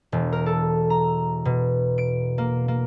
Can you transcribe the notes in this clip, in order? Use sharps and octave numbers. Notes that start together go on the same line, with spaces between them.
E1
A#4
A4
A#5
B2
D7
A#3
A#3